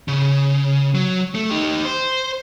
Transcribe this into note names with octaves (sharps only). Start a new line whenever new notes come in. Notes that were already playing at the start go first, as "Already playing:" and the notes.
C#3
F#3
A3
D#4 G4
C5